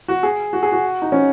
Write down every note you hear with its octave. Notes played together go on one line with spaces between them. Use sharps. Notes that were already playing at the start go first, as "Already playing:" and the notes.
F#4
G#4
F#4
G#4
F#4
D#4
C#4